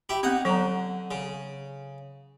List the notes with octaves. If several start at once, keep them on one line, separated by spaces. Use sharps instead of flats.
E4 G4
B3 C4 D#4 F#5
D3 F#3 A#5
C#3